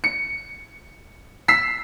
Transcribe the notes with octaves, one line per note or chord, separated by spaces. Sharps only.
C#7
E6 B6 C7